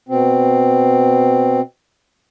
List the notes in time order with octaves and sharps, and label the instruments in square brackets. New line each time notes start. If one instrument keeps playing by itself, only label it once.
[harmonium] B2 C4